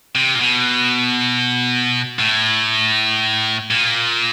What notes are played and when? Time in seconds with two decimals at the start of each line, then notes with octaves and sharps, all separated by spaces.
0.15 C3
0.35 A#2
0.41 B2
2.19 A2
3.71 A#2